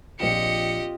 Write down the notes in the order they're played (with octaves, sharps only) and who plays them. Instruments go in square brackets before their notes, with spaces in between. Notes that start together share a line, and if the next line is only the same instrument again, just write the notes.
[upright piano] A#1 E7 [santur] C4 F4 [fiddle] G4 D#5 [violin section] C#7